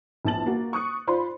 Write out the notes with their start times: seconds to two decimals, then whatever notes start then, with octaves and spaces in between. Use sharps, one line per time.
0.25 A#1 E2 A5 A6 F#7
0.46 A#3 F#4
0.73 C#6 D#6 F#6 C#7
1.07 F4 C5 D5 B5 C6